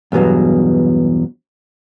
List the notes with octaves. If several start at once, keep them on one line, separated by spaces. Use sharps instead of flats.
E2 G2 B2 F#3